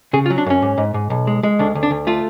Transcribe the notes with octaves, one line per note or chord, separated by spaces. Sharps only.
C#3 G#4
F4
F#3
D4
F#2 C#4
G#2
G#2
G#2
B1
G#3
G#3
D2 D4
D2
D4
D2
A3 F4